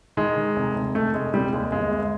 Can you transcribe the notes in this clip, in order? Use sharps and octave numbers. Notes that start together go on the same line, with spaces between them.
D#3 G#3
D#3
F1
F1
F1 A3
F1 G#3
F1 G3
D#2 G#3
G1 G#3
G1